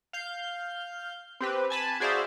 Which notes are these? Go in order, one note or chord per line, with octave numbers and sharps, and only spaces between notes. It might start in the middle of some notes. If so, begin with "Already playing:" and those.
F5 G6
C4 G4 B4
G#5 A5 B5
F#4 G#4 C5 D5 E5 F5